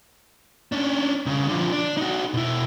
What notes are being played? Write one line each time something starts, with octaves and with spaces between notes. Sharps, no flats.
C#4 D4
C2 C#3
D3 F3
D4 D5
D#4 F#4
B2 E4